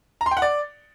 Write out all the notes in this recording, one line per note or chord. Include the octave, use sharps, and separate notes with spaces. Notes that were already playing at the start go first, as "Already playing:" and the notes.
A#5
C6
G5
F#5
D5